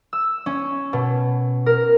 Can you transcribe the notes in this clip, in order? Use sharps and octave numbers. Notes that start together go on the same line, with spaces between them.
E6
C#4
B2
A#4